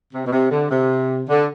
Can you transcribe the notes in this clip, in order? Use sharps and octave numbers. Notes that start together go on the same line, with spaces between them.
C3
B2
C3
D3
C3
D3